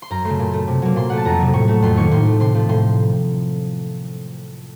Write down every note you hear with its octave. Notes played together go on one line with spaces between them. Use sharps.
C6
F#2 A#5
C#3 A3 C6
A#2
A3
C3
F#3 A#3
A#2 C6
A3 F#5
A5
F2 A#5
C3 F#3
A2 C#6
A3
F2 C6
D#3 A#3 C#6
A2 C6
A3
C3 C6
F3 A3
A2 C6